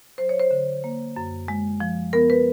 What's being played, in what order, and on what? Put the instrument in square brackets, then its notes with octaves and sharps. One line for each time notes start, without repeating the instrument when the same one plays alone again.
[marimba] F#3 C5
C#5
C5
D3
A#3
F#2
G#3
F3
B3 A#4
B4